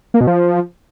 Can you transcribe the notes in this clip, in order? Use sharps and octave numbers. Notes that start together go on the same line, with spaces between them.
A#3
B2
F3